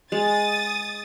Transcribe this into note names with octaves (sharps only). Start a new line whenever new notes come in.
G#3 D#6 A6